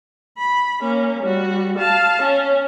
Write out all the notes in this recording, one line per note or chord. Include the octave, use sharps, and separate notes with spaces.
B5
A#3 C#4
G3 F#4
F5 A5
C#4